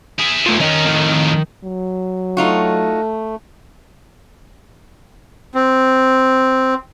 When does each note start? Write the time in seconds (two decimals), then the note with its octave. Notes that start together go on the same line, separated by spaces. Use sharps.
0.19 E4 G#4
0.46 A3 F4
0.60 D#3 C#4 A#4 D#5 A#5
0.85 F2 A2
1.64 F#3
2.37 A3 D#4 F4 F#4
5.54 C4